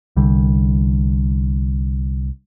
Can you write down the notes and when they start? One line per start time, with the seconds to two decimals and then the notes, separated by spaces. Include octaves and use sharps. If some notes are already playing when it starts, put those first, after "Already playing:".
0.16 C2 D3 G3